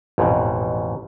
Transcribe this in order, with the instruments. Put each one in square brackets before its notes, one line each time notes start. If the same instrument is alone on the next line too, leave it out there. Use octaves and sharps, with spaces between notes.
[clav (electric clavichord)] A1 F2 G#2 B2